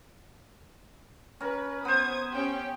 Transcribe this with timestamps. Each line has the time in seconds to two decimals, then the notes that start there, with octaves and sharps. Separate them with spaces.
1.41 C#4 A#4 B4
1.85 B3 C5 D#6 G#6
2.33 C#4 G4 G5